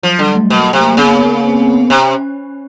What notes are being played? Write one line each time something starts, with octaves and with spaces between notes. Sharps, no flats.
F3 F#3
D3 G3
A3
B2 A#3
C3
C#3 B3
A#3
B3
C4
C3 C#4